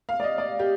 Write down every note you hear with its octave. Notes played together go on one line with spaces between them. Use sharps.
F5
D5
D#5
D5
G4